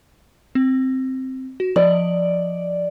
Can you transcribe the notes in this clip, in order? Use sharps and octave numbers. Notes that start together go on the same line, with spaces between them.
C4
F#4
F3 D5 D#5 F#7